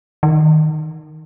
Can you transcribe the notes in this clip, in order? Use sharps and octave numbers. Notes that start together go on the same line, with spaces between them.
D#3